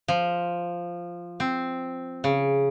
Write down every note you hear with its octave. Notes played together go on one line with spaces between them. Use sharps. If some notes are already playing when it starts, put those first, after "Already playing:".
F3
C4
C#3